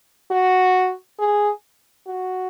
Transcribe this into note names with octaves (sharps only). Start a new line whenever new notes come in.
F#4
G#4
F#4